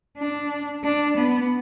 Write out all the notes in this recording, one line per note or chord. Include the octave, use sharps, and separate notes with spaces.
D4
D4
B3